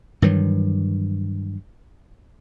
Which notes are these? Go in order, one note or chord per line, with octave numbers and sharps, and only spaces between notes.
G2 D#3 E3 F#3